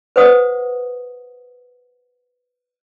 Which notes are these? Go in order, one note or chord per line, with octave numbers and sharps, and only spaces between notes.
B4 C5 F#5 D#6